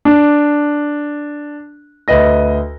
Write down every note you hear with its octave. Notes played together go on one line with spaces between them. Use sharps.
D4
D2 B4 D#5 A#6